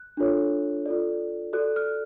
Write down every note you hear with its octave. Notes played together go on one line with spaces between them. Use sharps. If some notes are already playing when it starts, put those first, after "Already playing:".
Already playing: F#6
D4 F4 A4 C#5
F4 A4 D5
F#4 A4 D5 F#6
F6